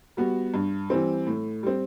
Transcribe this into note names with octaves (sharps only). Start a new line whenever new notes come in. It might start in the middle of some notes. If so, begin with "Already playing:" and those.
G3 B3 F#4
G2
E3 G3 C4
A2
G3 C4